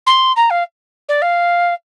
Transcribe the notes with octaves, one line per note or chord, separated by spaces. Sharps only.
C6
A#5
F5
D5
F5